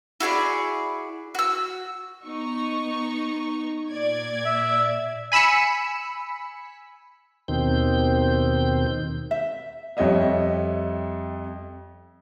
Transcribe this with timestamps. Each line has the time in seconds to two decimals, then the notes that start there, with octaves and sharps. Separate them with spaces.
0.20 E4 F#4 G#4 D5
1.35 F#4 E6
2.24 B3 D#4 C#6
3.91 A#2 D5 G#6
4.45 E5
5.32 G#5 B5 E6 B6 C#7
7.48 D#2 B2 D#3 C4 G6
9.31 E5
9.97 F2 G3 C#5 D#5 E5